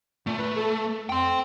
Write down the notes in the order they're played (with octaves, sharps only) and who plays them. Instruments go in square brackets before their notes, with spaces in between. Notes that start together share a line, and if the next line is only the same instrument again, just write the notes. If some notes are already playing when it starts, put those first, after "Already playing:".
[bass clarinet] A#2 [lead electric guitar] A3
[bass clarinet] B4
A4
[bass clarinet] F2 [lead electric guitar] G5 C6